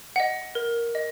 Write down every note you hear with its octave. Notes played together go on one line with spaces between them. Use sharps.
D#5 F#5
A#4
D#5